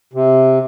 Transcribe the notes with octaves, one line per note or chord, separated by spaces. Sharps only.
C3